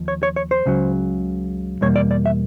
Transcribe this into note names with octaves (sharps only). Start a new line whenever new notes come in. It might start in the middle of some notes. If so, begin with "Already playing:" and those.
Already playing: D#2 F3
C#5
C#5
C#5
C5
C#2 C#3 F#3
E2 B2 G3 A#3 C#5
D5
D5
E5